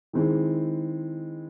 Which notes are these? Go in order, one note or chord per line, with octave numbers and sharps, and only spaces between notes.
D#3 G#3 C4 E4